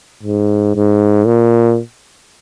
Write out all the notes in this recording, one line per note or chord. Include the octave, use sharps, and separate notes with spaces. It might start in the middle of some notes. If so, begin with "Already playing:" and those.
G#2
G#2
A#2